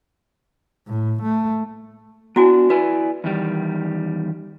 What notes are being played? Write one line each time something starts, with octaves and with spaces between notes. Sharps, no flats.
A2
A3
B3 D4 E4 F#4 G#5
E4 B4 D5 G#5
E2 D#3 G3